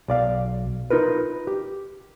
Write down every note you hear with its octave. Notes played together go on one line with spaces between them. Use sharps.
B1 D5 F5
D#4 F4 A#4 B4
G4